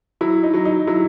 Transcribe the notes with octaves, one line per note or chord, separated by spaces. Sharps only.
F#3 E4
D#4
F#3
D#4
F#3 E4